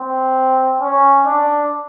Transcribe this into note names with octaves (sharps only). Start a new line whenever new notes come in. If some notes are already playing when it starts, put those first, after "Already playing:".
Already playing: C4
C#4
D4